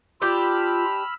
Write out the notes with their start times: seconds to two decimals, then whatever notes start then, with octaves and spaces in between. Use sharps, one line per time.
0.22 D4 F4 G4 B5 E6 F6